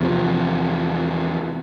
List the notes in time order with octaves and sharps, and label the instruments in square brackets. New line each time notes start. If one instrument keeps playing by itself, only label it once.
[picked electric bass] E2 C3 F3